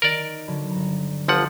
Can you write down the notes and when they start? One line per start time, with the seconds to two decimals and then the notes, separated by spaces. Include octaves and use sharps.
0.02 D#3 A#4 D5
0.48 D3 F#3 B5
0.71 G1 A#5
1.28 G1 F3 F#5